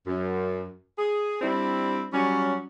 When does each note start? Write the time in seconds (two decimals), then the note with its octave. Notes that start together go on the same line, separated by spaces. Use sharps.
0.07 F#2
0.98 G#4
1.41 G3 C4 D4 E4
2.13 F#3 G3 C#4